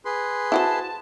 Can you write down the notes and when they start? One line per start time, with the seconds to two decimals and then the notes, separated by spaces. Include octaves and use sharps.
0.05 G#4 B4 C6
0.52 E4 F#4 C5 A5